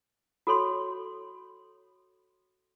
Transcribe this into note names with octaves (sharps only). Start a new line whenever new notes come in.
F#4 A4 C#5 C6